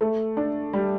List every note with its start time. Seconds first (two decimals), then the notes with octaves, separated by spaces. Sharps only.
0.01 A3
0.37 D4
0.73 G3